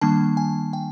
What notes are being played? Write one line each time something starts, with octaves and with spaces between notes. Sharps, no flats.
D#3 G3 A#3 D4 A5
G#5
G5